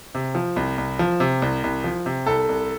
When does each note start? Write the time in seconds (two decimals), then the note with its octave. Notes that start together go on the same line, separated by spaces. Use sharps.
0.15 C3
0.35 F3
0.56 C2
0.78 C2
0.99 F3
1.20 C3
1.42 C2
1.64 C2
1.84 F3
2.06 C3
2.26 C2 A4
2.49 C2